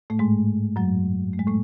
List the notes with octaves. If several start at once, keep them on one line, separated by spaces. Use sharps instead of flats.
A2 A3
G#2 G#3
F#2 F#3
A3
G#3
A2 A3